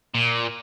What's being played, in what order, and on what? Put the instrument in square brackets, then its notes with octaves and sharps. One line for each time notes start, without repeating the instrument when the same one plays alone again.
[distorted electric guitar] A#2